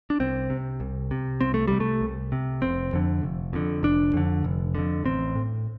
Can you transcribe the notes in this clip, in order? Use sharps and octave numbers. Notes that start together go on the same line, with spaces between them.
D4
C2 C4
C3
C2
C3
C2 C4
A3
C3 G3
A3
C2
C3
F1 C4
F2 D3
F1
F2 D3
F1 D4
F2 D3
F1
F2 D3
A1 C4
A2